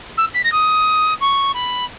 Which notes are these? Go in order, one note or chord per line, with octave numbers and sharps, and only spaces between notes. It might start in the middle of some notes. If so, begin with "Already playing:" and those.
E6
B6
A#6
D#6
C#6
B5